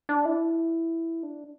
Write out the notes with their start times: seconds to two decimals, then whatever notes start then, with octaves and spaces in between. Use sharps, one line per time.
0.09 D4
0.25 E4
1.23 D4